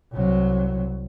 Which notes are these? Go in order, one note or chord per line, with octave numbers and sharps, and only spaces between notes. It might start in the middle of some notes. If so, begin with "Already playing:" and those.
C2 F#3